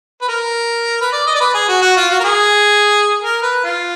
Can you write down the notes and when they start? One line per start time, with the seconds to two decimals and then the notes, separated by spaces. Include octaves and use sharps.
0.21 B4
0.29 A#4
1.01 B4
1.13 D5
1.27 D#5
1.35 D5
1.40 B4
1.54 G#4
1.68 F#4
1.82 F#4
1.96 F4
2.10 F#4
2.20 A#4
2.24 G#4
3.22 A#4
3.43 B4
3.64 F4